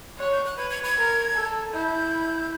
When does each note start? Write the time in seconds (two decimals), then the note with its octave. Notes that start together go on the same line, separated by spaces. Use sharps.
0.19 C#5 F#6
0.32 G6
0.45 F#6
0.57 B4 G#6
0.70 G#6
0.84 G#6
0.97 A#4
1.35 A4
1.74 E4 G6